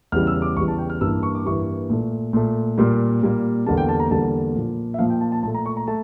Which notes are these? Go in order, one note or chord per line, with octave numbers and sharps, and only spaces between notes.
E2 C#3 E3 G3 F6
E6
D6
E2 C#3 E3 G3 C#6
A5
G5
F6
G2 E3 G3 A#3 E6
C#6
D6
G2 E3 G3 A#3 C#6
A#2 A3
A#2 A3
A#2 G3 A#3
A#2 G3 A#3
E2 D3 G3 A#3 A5
G5
A5
A#5
E2 D3 G3 A#3 A5
A#2 F3 A#3
E5
A#2 F3 A#3 F5
G5
A5
A5
A#2 A3 A5
A#5
C#6
A#5
A3 A5